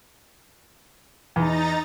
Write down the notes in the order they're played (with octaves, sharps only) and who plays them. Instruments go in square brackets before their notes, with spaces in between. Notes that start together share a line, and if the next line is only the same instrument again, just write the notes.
[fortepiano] E2 [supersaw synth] D#4 A#5 A6